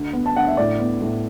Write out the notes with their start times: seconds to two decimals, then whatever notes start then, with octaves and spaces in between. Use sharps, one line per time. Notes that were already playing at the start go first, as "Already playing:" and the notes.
Already playing: D2
0.13 B3
0.26 A5
0.36 D2 F#5
0.47 E5
0.57 A2 D5
0.79 B3
1.01 A2